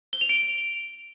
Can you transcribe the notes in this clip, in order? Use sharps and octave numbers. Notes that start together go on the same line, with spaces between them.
G7
F7
D7